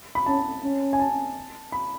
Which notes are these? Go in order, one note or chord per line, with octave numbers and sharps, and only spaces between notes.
B5
C#4 A5
C#4
G#5
A5
B5